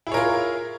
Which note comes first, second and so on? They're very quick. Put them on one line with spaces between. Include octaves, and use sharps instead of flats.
E4 G#4 C#5 A#4 F4